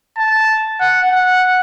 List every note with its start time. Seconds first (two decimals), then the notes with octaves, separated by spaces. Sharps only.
0.18 A5
0.80 F#5
1.11 F#5